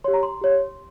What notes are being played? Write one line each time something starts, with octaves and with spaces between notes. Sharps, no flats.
G4 C#5 C6
A#5
C6
G4 C#5